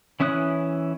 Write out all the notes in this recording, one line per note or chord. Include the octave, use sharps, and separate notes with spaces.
E3 C#4 E4 D#6 F#6